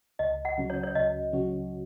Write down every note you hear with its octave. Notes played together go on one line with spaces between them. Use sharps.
C#2 D#5
F#5
C#3 F#3 C#4 F#4
C#5
C#5
C#2 D#5
C#3 F#3 C#4 F#4